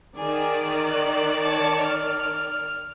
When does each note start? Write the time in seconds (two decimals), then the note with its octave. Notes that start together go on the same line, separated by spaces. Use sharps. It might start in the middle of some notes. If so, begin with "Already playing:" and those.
0.16 D#3 G#4 D5
0.89 F#6
1.43 C#5 A5
1.83 F6